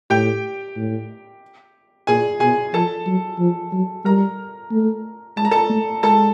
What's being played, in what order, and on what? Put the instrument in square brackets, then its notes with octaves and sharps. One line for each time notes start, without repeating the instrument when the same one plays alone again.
[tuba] A2 [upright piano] G4 G5
[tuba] A2
[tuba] A#2 [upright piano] G#4 G#5
[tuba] B2 [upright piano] G#4 G#5
[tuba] F3 [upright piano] A4 A5
[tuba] F#3
F3
F#3
[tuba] G3 [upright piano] A#4 A#5
[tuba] A3
[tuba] G#3 [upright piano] A5
[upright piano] A#5
A4 A5
[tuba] A3
[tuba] G#3 [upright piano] A4 A5